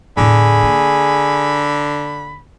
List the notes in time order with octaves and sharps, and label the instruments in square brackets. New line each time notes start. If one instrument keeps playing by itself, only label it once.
[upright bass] E2 A2 [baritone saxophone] D3 [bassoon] G#4 [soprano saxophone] B5
[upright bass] A#3